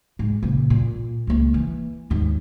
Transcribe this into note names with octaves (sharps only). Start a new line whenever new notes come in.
G#2
A#2 C#3
A#2
C#2 A#3
E3
D#2 G#2